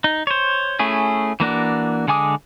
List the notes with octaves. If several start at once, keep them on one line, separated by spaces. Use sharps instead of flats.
D#4
C5 C#5
A3 C#4 E4 G#4
E3 A#3 D4 F#4
D3 G#3 G#5 D6 D#6